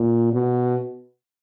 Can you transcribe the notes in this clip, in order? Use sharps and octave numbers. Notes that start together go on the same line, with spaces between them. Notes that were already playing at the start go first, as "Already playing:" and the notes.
Already playing: A#2
B2